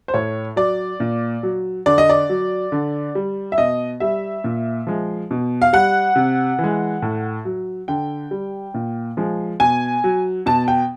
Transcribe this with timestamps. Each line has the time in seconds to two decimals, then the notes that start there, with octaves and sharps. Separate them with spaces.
0.08 C5
0.14 A2 C#5
0.56 F#3 D5
1.00 A#2
1.43 F#3
1.86 D3 D5
1.98 D#5
2.10 D5
2.29 F#3
2.72 D3
3.15 G3
3.52 E5
3.58 B2 D#5
4.00 G3 E5
4.44 A#2
4.87 F3 G#3
5.31 B2
5.62 F5
5.73 G3 F#5
6.16 C3
6.59 E3
6.64 G#3
7.02 A2
7.45 F#3
7.88 D3 G5
8.31 G3
8.74 A#2
9.17 F3 G#3
9.60 B2 G#5
10.04 F#3
10.46 B2 A5
10.68 G5